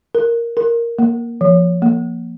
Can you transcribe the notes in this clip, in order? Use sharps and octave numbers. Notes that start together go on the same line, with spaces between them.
A#4
A#4
A#3
F3
A#3